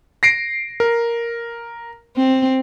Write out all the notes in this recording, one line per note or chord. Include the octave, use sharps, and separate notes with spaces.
A#6 C7 D7
A#4
C4